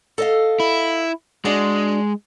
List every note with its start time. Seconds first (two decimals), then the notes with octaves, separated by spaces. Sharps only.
0.18 A4 D#5 F5
0.60 E4
1.45 G#3 D4 F#4